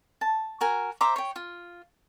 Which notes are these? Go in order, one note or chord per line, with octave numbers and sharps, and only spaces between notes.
A5
F#4 A#4 G#5
C5 E5 A#5 D6
C#5 G5
F4